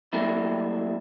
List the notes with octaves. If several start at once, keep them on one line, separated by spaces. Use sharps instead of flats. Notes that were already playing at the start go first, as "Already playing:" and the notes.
F#3 G3 A3 A#3 E4